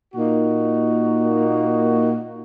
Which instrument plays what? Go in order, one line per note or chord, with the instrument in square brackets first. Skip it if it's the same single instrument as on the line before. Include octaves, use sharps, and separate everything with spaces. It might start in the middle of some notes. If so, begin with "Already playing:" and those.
[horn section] A#2 A#3 D#4 F#4